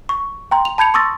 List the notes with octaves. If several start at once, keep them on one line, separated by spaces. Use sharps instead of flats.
C#6
G5 A#5 C6
F7
A5 B5 G6 G#6 C#7 F7
C6 C#6 D#6 E6 A6 A#6